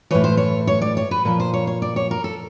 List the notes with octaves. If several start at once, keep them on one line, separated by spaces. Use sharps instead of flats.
A2 E3 C#5
C5
C#5
C#5
D5
C#5
B4
A#2 F3 B4
C5
C#5
C#5
D5
C#5
A#4
A4